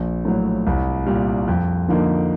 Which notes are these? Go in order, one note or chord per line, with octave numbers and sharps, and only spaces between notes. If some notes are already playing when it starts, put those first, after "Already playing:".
Already playing: A#1
A2 F#3
C2
A#2 G3
F2
D3 F3 A#3 D#4